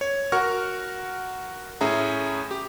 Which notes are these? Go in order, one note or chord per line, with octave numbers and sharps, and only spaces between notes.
C#5
F#4 A#4 F#5 C#6 F6
A2 C#4 G#4 E5 A#5
G4